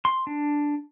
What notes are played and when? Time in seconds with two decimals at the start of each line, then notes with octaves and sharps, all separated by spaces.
0.05 C6
0.27 D4